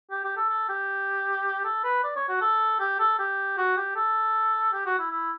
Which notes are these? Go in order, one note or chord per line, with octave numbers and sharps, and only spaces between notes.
G4
G4
A4
A4
G4
A4
B4
D5
C#5
F#4
A4
G4
A4
G4
F#4
G4
A4
G4
F#4
E4
E4